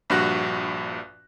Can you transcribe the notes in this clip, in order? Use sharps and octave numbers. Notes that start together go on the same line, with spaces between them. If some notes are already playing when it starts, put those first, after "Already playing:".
A#1 G2 F#4 F#6 A#6